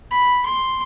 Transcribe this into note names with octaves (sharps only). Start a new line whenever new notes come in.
B5
C6